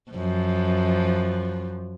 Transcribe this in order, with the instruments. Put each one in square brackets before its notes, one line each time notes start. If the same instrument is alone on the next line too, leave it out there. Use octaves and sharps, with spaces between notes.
[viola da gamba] F#2 F3